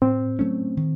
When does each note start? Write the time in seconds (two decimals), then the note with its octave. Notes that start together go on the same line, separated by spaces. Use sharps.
0.01 A2 C4
0.39 F#3 A3 C#4
0.77 D#3